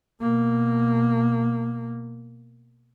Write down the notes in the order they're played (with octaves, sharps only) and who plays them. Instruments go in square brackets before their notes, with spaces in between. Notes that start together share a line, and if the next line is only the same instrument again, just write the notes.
[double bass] B2 A#3